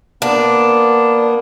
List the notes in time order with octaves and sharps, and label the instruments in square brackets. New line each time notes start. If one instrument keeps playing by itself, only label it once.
[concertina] A#3 B3 [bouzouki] D4